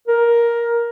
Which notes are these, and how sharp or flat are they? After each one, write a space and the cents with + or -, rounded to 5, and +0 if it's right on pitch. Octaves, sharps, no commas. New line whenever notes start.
A#4 +10